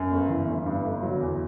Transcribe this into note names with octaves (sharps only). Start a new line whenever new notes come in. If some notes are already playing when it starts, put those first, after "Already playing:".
Already playing: F#2
G1
E3
G1
G2
G1
F#3
E2